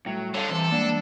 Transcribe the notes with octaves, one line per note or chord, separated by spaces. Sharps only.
A2 F#3 G3
D3 D#4 A4 C#5 F5
C3 E3 A4
E3 G3 G#3 A#3 B3 D4